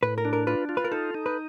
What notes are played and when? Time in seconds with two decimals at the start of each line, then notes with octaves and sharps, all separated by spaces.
0.03 A2 B4
0.18 A#4
0.25 D4
0.33 A#4
0.47 F4 B4
0.69 F4
0.77 B4
0.84 A#4
0.92 D#4 A4
1.15 D#4
1.26 B4